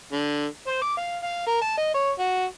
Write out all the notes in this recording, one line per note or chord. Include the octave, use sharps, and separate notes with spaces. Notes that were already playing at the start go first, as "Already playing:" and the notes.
D3
C5
D6
F5
F5
A#4
A5
D#5
C#5
F#4